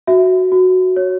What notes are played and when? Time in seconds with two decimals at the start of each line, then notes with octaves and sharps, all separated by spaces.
0.07 F#4 E5
0.52 F#4
0.96 C#5